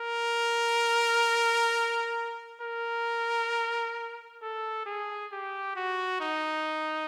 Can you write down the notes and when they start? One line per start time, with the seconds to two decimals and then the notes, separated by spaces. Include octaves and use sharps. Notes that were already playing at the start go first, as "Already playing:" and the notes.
Already playing: A#4
2.61 A#4
4.42 A4
4.86 G#4
5.32 G4
5.76 F#4
6.20 D#4